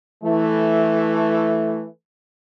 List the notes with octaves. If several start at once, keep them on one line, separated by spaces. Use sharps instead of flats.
E3 A3